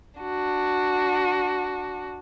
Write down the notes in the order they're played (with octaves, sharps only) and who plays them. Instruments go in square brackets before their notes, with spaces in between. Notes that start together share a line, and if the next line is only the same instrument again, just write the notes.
[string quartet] D4 F#4